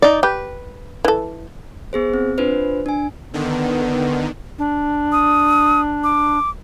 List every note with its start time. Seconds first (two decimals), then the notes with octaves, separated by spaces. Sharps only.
0.02 D#4 D5
0.23 G4 B4
1.05 E3 A4
1.93 B3 G#4 C5
2.14 C4
2.38 D4 F4 B4 C5
2.86 D4 G#5
3.34 D3 D#3 B3
4.59 D4
5.12 D#6
6.04 D6